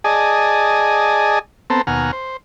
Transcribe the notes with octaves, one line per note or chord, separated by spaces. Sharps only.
G#4 D5 D#5 G#5 A5
B3 C4 A4 C5 A5 A#5
D#2 B2 F#5 G#5 A#5 F6
C5